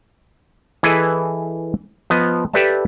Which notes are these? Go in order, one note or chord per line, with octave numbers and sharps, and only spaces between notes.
E3 E4 G#4 A4 B4 D#5
F3 B3 D#5
G4 A4 B4 D5 E5 A5